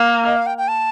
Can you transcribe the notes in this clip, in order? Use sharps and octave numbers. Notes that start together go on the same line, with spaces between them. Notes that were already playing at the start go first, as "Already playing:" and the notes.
Already playing: A#3
D#5
F5
G5
G5
A5